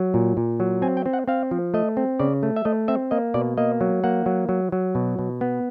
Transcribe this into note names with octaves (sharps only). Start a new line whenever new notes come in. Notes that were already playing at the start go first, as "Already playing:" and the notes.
Already playing: F#3
A#2
A#2
F#3
C4 G#5
G5
C4
F#5
C4 F5
F3
A3 D#5
C4
C#3 D5
A3
E5
A3 D#5
C4 E5
A#3 D#5
B2 D5
A#3 D#5
F#3
A#3 F#5
F#3
F#3
F#3
B2
B2
B3